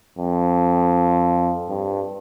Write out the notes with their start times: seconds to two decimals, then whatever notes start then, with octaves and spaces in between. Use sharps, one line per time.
0.18 F2
1.69 G2